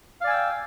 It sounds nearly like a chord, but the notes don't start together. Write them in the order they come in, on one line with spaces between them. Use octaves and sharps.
F5 D5 G#5 E6 G5